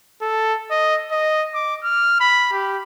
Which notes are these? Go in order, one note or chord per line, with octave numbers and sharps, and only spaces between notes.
A4
D#5
D#5
D6
F6
B5
G4